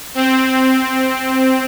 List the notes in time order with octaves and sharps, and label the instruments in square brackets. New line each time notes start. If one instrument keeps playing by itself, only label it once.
[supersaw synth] C4